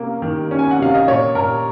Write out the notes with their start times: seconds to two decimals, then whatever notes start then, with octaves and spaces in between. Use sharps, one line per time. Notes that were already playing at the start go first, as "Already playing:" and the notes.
Already playing: C3 A#3 C#4
0.22 D#3
0.51 C#4
0.59 G#5
0.71 F#5
0.79 C3 F5
0.95 D#5
1.07 A#2 C#5
1.35 A#2 A#4